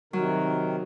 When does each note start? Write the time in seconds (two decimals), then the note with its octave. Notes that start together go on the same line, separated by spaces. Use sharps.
0.13 C3 D#3 F#3 A#4